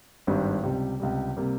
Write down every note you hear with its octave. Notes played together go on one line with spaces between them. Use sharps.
G#1 G2 G3
C#2 C3 G3
C#2 C3 G3
C3 G3 A#3